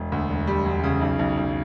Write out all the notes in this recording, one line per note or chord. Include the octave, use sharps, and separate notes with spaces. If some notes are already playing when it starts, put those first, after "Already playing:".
Already playing: E1
D2
E1
G3
E1
C#3
B1
B1
B1